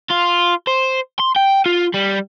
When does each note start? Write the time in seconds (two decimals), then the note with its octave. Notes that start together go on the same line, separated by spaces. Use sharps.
0.10 F4
0.67 C5
1.19 C6
1.36 G5
1.66 F4
1.94 G3